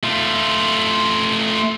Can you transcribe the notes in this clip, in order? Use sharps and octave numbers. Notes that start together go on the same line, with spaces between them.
A3 F4